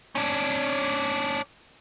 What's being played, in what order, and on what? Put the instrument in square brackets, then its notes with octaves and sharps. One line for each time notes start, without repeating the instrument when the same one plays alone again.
[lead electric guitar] C#4 D4